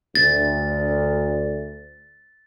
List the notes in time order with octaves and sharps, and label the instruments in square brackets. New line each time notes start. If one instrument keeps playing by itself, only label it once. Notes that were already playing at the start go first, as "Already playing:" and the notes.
[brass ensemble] D2 [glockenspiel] A6